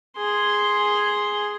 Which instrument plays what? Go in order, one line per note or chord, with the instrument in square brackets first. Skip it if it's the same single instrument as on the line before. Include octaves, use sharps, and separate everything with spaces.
[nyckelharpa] G#4 C6